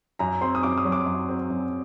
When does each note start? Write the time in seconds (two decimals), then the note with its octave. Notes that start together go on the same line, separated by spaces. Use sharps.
0.19 F#2 A#5
0.41 C4 C6
0.55 D#6
0.63 F#2 D6
0.78 D#6
0.85 F#3
0.92 D6
1.06 F#2
1.29 C4
1.50 F#2